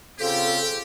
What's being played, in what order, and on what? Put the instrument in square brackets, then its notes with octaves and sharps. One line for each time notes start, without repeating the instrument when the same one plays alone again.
[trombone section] C#3 C4 F4 [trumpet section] G4 [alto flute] A4